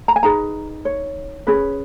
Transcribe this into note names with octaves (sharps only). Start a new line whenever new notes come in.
A#5
G#5
D#4 G#4 B4 A#5
C#5
C#4 G#4 B4